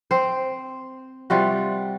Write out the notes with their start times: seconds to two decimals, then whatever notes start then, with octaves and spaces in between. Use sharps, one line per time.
0.11 C4 C5
1.30 C3 G3 F4 F#4